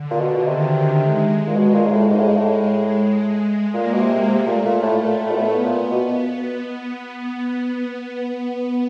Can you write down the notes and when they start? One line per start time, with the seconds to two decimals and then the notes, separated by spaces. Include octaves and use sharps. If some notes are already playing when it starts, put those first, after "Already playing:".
Already playing: D3
0.10 A#2
0.20 B2
0.33 B2
0.47 C3 D#3
1.02 G#3
1.47 A#2
1.56 B2
1.74 A#2
1.86 G#2
1.92 A2
2.10 G#2 G#3
2.19 A2
2.28 G#2
2.37 A2
3.19 G#3
3.73 A#2 A#3
3.94 B2
4.01 C3
4.28 C3 A3
4.46 A#2
4.65 A#2
4.82 A2
5.00 A#2
5.19 A2
5.31 A#2
5.36 A2 B3
5.64 A#2
5.91 B2